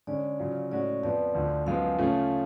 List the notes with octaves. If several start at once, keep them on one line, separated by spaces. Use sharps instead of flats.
D3 G#3 C#4 D5
C#3 F#3 C#4 F4
A2 G#3 C#4 F#4 D5
F2 F3 B3 D5
D2 D3 F3
F#2 F3 G#3 B3 F5
C#3 F3 A3 C#4 F4